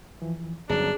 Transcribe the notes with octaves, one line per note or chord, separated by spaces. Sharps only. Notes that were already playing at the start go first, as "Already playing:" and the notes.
E2 E3 F3
G1 F#3 C#4 D4 G#4 A5 A#5